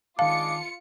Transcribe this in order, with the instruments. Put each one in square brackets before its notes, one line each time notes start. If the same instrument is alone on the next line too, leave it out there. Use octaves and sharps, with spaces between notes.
[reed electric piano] D#3 A5 [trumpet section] G#3 D4 D6 [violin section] F4 C#7 [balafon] F5